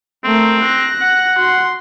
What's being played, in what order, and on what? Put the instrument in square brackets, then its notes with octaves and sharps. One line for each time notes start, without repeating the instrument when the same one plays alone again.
[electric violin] A3 A#4 [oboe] C4
[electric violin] F#6 A#6
[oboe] F#5
[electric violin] F#4 C6